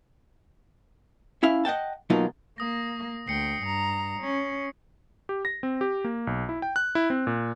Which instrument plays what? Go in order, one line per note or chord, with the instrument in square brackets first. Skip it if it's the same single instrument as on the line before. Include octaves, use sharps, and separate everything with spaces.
[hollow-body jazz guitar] C#4 E4 E5 F5
D#5 F#5 G5 A5
B2 F#3 A#3 D#4 F4
[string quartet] A#3 [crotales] D#6 A#6
[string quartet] D2 G5 [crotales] C7 C#7
[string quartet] G2 A#5
C#4
[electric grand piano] G4
A#6
C4
G4
A#3
B1
E4
G5
F#6
E4
C4
A#2